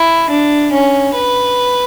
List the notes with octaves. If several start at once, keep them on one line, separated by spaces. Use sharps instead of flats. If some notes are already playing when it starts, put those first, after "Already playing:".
Already playing: E4
D4
C#4
B4